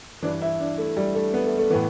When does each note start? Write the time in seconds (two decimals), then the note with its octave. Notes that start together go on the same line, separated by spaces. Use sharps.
0.22 E3 D4
0.26 G2
0.42 E4
0.60 D4
0.78 A3
0.97 G3
1.15 A3
1.34 B3
1.46 A3
1.58 A3
1.70 A2 E3 B3